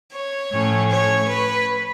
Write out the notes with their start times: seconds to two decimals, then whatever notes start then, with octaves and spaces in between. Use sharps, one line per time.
0.12 C#5
0.51 A2 F3 A3 C#4
0.91 C#5
1.28 B4